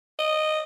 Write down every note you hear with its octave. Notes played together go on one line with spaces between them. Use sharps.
D#5